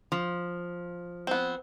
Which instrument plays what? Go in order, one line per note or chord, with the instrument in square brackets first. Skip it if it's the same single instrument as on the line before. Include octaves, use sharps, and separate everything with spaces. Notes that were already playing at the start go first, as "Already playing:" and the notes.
[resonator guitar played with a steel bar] F3
[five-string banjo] B3 C4